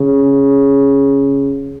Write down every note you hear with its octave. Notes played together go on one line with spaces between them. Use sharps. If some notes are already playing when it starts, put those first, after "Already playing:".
Already playing: C#3